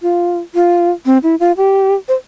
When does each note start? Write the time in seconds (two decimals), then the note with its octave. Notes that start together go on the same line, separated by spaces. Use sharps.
0.02 F4
0.55 F4
1.06 C4
1.23 E4
1.40 F4
1.57 G4
2.09 C5